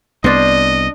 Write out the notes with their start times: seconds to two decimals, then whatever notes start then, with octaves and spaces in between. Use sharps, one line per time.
0.24 C2 B3 D4 C5 D#5